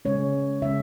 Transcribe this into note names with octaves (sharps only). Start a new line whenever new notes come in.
C#3 G#3 C#4 C#5
C#3 G#3 C#4 E5